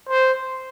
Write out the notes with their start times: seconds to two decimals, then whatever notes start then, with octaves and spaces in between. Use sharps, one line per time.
0.09 C5